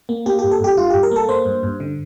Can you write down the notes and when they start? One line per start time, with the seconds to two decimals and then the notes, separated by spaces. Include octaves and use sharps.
0.09 A#3
0.26 A#3 G4
0.39 G2 G4
0.51 A4
0.60 G2 G4
0.77 G2 F4
0.90 G2 G4
1.03 A#4
1.11 A#3 A4
1.29 A#3 C5
1.45 G2
1.63 G2
1.80 D3